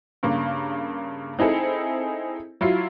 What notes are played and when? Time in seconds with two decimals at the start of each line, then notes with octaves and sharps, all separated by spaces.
0.23 G2 C#3 A#3
1.39 C4 D#4 E4 G#4 A4
2.61 F#3 E4 F4 C7